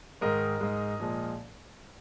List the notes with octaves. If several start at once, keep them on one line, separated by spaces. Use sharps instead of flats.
G#2 D#3 G#3 A#4 D#5
G#2 G#3
A#2 F3 G#3